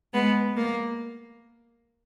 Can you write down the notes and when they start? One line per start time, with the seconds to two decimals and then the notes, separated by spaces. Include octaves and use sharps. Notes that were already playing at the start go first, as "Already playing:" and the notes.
0.13 G#3 B3
0.56 A#3